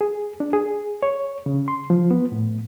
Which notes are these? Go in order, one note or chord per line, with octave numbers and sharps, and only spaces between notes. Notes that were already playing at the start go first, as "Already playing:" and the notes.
G#4
D4
G#4
C#5
C#3
C6
F3
B3
A2